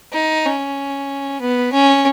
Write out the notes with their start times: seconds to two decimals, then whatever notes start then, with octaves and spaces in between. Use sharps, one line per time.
0.13 D#4
0.46 C#4
1.41 B3
1.72 C#4